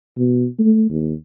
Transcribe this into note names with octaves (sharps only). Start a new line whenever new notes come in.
B2
A3
D#2